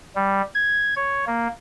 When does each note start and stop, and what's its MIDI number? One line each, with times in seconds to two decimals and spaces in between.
0.16 0.42 55
0.55 0.94 92
0.96 1.25 73
1.27 1.48 58